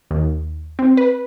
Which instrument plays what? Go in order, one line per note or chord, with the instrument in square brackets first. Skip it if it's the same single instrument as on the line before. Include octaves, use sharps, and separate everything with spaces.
[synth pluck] D#2
C4
B4